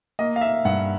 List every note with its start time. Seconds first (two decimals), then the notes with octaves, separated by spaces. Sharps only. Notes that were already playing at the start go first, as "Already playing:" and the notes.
0.19 A#3 D#5
0.36 F5
0.41 E5
0.65 G2 F#5